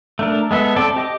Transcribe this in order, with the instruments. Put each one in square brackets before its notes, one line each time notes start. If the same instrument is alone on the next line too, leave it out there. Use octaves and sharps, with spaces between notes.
[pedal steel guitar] A3 D4 A#4
G#3 B3 A4 E5
C4 A4 D5 A5
G4 D#5 D6